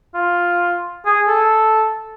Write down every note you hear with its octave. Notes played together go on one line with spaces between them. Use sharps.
F4
G#4
A4